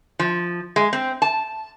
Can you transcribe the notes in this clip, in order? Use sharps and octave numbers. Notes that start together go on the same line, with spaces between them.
F3
G#3
C4
A5